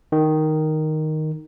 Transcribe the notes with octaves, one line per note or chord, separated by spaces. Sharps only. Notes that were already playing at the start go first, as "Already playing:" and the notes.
D#3